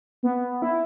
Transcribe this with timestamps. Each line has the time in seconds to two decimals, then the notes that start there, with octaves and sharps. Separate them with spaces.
0.23 B3
0.62 E4